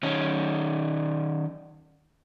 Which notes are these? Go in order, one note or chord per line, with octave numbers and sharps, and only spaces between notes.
D#3 C#4